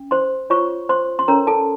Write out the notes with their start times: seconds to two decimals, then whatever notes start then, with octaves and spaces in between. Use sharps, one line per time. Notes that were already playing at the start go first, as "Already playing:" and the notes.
Already playing: C#4
0.11 C5 C6
0.50 F4 C5 C#5 C#6
0.89 C5 C6
1.19 C6
1.28 C#4 A4 A#4 C#5 A#5
1.47 A4 A5